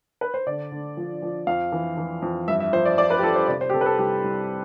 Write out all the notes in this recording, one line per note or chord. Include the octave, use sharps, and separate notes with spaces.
B4
C5
D3 D5
D3
F3
F3
F2 F5
E3
E3
F2
G2 E5
E5
F3 C5
D5
F3 D5
B4
G4
F3 A4
C5
C3 D5
C5
G4
C3 A4
B4
A4
C2 G4
C2